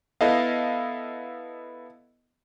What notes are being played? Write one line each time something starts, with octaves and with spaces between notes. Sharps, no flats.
B3 E4 A4 D#5 F5